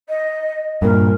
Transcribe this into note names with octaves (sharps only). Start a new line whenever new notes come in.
D#5
G2 A#2 A#4